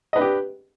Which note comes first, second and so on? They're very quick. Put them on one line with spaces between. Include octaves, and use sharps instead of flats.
D#5 B4 D4 G4